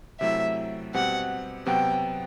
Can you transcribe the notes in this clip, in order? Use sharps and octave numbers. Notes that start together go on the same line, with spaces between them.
C3 F#3 A3 E4 E5
B2 G3 C4 G4 F#5
C3 F#3 B3 F#4 G5